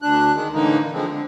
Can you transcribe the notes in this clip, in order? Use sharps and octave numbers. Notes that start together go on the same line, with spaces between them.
D2 D4 F#6
D#3 G#3
A2 D3 E3 A#3 D#4
D3 F3 G#3 C4
D3